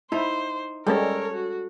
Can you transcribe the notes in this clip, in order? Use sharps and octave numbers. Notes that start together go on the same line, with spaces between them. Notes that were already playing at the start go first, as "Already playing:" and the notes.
D#4 E4 C5
G3 G#3 C#4 A4 A#4 C#5
F#4